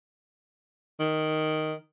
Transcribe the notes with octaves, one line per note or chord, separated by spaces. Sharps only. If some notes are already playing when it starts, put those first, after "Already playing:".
D#3